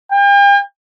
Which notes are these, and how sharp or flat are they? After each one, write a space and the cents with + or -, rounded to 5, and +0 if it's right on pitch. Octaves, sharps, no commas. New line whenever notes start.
G5 +45